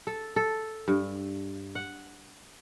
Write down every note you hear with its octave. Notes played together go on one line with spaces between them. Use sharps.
A4
A4
G2
F#5